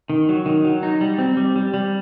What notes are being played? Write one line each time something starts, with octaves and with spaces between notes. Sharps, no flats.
D#3
F#3
D#3
F#3
D#4
G3
C4
G3
G3
G3